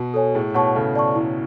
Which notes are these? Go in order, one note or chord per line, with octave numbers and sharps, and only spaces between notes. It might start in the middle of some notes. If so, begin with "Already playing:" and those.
Already playing: B2 F#4
A4 C#5 G#5
A2 G#4
B2 C#5 F#5 A5 C#6
C#3 A4
D5 A5 C#6
E4